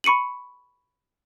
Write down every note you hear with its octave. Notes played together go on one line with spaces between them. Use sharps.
B5 C#6 C#7 D#7 F#7